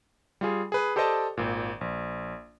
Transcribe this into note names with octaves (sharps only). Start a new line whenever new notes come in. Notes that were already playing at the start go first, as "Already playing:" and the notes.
G3 F4 G#4
G#4 B4
G4 A4 C5 D5 D#5 A5
G#1 A#2
A#1